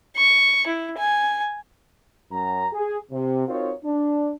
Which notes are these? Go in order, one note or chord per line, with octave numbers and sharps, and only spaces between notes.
C#6
E4
G#5
F#2 A#5
G#4
C3
C4 D#4 F4 F#4 A#4 C#5
D4